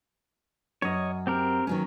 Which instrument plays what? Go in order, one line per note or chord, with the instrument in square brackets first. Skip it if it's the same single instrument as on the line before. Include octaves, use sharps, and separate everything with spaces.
[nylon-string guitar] F#2 [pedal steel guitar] C#5 D#5
[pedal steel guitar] C4 G4 A#4
[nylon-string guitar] D#3 F#3 C#4